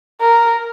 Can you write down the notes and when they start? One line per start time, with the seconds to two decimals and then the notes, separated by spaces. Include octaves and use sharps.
0.21 A#4